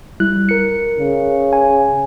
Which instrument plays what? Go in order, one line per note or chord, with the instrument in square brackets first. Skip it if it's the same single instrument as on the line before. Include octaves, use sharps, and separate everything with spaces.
[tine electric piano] G3 E4 F#6
A#4 C#7
[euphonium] C#3
[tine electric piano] G#5